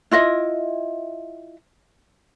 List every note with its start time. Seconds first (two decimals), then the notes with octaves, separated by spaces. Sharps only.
0.11 E4 F4 D#5 E5